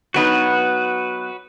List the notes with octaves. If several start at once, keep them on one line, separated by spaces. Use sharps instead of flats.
F#3 B3 D#4 F#4 B4